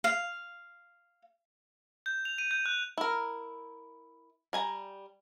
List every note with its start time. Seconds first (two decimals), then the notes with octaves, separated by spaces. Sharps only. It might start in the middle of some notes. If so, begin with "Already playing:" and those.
0.04 F5
2.06 G6
2.25 F7
2.38 D#7
2.51 G6
2.66 F#6
2.98 E4 A#4
4.53 G3 G#5 A#5